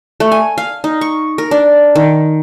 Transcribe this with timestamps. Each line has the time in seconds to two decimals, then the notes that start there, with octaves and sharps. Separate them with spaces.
0.20 A3
0.32 G#5
0.58 F5
0.84 D#4
1.01 C#6
1.38 A#4
1.51 D4
1.96 D#3